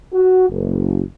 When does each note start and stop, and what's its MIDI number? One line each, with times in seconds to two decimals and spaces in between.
0.13 0.47 66
0.49 1.02 30